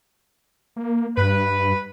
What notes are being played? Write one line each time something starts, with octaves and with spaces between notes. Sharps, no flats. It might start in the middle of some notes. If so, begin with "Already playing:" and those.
A#3
G2 B4